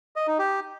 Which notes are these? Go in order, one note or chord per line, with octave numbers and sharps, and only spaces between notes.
D#5
D#4
G4